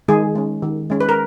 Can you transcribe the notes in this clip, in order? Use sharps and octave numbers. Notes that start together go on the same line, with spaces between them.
D#3 G#3 G#4
G#3 C#4
D#3
G#3 C#4
B4
A#4